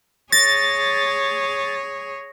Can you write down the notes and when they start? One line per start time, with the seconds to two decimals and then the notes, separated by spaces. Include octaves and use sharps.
0.32 G#4 C#5 A6 A#6